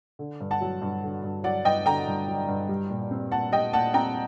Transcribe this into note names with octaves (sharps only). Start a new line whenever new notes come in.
D3
G2
F#5 A5
F#3
G2
D3
G2
F#3 D5 F#5
G2 D#5 G5
D3 G5 A#5
G2
F#3
G2
G3
A#2
C4
A#2 F#5 A5
G3 D#5 G5
A#2 F#5 A5
C4 G5 A#5